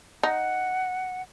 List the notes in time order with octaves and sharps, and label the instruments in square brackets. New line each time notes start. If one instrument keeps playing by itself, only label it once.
[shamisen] D#4 [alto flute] F#5